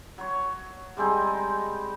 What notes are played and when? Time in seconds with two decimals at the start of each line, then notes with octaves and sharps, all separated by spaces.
0.18 F#3 C#5
0.97 G3 G#3 C4 D#4